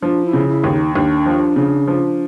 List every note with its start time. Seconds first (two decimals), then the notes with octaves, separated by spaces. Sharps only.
0.02 F3 D4
0.26 E4
0.33 C#3
0.49 E4
0.64 D#2
0.72 D#4
0.94 D#2 D4
1.26 F3
1.56 C#3
1.88 F3